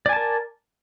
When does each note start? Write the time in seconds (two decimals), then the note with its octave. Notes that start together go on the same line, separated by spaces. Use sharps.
0.06 D5
0.09 G#5
0.13 A5
0.16 A#4